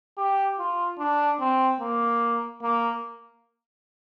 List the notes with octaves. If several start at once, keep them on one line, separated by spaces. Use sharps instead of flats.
G4
F4
D4
C4
A#3
A#3